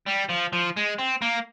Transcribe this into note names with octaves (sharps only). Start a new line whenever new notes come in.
G3
F3
F3
G#3
C4
A#3